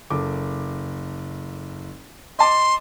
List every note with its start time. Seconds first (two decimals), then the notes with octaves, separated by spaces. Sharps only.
0.10 F#1 A4 D6
2.39 D#5 A5 C6 D6